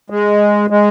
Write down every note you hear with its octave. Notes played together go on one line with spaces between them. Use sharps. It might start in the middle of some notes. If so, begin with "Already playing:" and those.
G#3
G#3